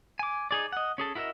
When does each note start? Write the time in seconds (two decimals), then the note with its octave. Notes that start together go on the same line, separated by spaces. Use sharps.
0.19 G#5 D6
0.51 D#4 G#4 D5
0.72 D#5 F#5
0.98 C#4 G#4 A4
1.15 E4 F#4 A#4 D#5 E5